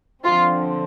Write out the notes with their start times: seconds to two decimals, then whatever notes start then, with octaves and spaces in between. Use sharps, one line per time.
0.23 D3 F3 C4 F4